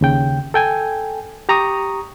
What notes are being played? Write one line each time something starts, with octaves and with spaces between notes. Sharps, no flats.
D#2 C#3 G5
A4 G5 G#5
G4 A#5 C#6 D#6